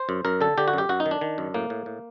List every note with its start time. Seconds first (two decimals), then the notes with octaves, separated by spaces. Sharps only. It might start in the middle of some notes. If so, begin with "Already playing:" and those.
Already playing: C5
0.09 F#2
0.25 F#2 A#4
0.41 D3 A4
0.58 D3 G4
0.68 F#4
0.73 F#2 G4
0.89 F#2 F#4
1.00 D#4
1.06 D#3
1.11 D4
1.21 D#3
1.38 F#2
1.54 A2 A#3
1.70 A2
1.86 A2